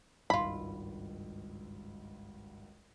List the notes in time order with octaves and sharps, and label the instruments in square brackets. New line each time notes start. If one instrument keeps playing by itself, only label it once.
[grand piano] G#1 C#2 G2 [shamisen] E4 F4 [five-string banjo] B5